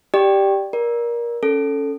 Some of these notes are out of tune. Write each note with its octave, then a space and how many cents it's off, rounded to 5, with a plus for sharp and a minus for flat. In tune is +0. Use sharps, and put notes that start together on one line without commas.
G4 +0 D5 +5 G5 +0
A#4 +20 D5 +0
C#4 +0 A4 +0